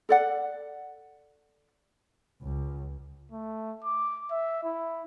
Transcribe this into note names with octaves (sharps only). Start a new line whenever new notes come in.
A4 D5 F#5
C#2
A3
D6
E5
E4